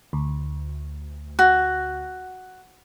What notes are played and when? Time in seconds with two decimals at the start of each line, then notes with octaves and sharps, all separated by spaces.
0.13 D2
1.39 F#4